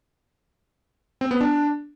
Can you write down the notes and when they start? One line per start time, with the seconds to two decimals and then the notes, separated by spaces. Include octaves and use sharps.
1.21 C4
1.31 B3
1.41 D4